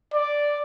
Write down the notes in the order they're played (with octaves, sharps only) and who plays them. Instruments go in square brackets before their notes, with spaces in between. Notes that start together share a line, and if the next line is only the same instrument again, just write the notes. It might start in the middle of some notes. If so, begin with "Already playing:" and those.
[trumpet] D5